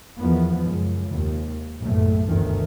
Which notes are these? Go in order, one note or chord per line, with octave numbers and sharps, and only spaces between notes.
E2 D#3 F3 B3
C#2 F#2
D#2 C3
F#1 B1 A2 C3 A3
G1 D2 G2 C3 D#3 E3